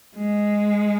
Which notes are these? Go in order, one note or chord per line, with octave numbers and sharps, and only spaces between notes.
G#3